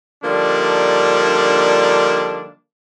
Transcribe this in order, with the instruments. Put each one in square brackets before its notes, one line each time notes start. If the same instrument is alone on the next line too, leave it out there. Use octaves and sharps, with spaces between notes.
[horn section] D3 F3 G3 A#3 D4 D#4